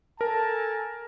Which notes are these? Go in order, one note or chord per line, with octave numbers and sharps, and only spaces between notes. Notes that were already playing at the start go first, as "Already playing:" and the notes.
A4 A#4 G#5 A5